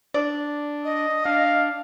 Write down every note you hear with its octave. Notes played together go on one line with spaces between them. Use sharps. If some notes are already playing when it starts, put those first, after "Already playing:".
D4 D5
D#5 D#6
D4 F5